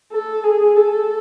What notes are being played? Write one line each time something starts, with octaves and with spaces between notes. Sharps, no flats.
A4
G#4
A4